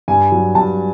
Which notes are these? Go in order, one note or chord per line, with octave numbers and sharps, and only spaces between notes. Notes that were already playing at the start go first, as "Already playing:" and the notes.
G2 G#5
F#3
G2 A5